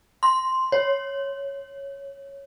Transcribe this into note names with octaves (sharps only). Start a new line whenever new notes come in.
C6
C#5